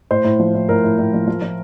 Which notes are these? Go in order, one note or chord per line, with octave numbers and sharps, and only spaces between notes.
A2 C5
A2
F3
A2
A2 A#4
A2
A2
F3
F3
F3